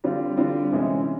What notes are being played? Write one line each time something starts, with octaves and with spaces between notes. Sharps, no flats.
D3 G3 C4 F4
D3 G3 C4 F4
C3 E3 G#3 C#4